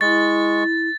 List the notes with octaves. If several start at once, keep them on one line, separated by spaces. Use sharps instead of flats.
G#3 E4 C#6 A6